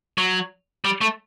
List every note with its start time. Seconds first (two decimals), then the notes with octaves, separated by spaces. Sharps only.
0.18 F#3
0.85 G3
1.01 A3